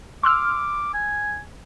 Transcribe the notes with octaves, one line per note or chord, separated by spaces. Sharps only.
C6 D6 E6 F6
G#5